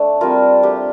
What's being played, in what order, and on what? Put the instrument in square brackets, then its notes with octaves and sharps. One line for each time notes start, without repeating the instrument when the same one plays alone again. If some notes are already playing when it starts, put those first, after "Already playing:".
Already playing: [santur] A3 D4
G3 C4 F4 A#4
A3 D4 F4 G4